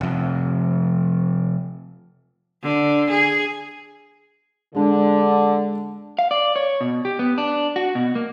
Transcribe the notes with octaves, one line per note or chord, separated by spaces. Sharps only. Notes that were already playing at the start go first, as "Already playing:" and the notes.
F1 F2
D3
G#4
D3 G#3 D4
F5
D5
C#5
B2
G4
B3
D4
F#4
B2
A#3